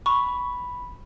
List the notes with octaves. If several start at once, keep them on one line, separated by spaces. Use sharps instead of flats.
B5 C#6